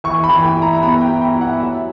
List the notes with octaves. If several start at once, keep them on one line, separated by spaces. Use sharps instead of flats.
E3 C#6
B5
E3
G5
E4
A#5
B3 B5
G5
E4
G5
E4
F#5
F#3 E5